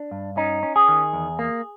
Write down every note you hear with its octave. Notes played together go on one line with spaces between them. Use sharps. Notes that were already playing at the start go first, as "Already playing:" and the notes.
Already playing: D4
G2
C#4 D#4
C#4
G#4
D#3
E2
A#3